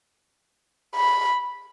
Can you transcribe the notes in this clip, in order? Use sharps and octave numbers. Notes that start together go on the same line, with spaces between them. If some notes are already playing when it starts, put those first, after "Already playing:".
B5